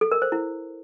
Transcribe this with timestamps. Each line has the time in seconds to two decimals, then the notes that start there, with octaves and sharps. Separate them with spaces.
0.01 A4
0.12 A#4
0.22 C5
0.32 E4